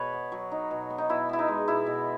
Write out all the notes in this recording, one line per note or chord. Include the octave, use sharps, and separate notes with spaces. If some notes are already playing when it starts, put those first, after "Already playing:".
Already playing: B2 B4 C#5
B3
F#3
D#4
B2
B3
D#4
B2 E4
B3 E4
D#4
G#3
B2 E4
B2